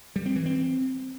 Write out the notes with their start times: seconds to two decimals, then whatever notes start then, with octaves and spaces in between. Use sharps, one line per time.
0.16 G3
0.26 C4
0.36 E3
0.46 C4